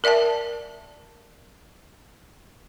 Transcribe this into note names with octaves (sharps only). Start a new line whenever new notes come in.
A#4 D5 E5 G5 A5